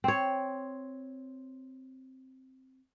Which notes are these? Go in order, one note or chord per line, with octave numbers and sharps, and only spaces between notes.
C4 C#5